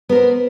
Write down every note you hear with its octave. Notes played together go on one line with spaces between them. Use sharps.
B3 A#4 C5